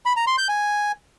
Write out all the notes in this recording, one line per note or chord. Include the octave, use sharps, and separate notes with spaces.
B5
A#5
C6
G6
G#5